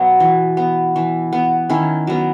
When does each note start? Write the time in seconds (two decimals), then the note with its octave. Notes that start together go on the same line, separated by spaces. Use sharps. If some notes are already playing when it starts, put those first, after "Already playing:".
Already playing: B2 F#3 B3
0.20 E3
0.57 B3
0.96 E3
1.33 B3
1.69 D#3 C#4 E4
2.07 F#3 B3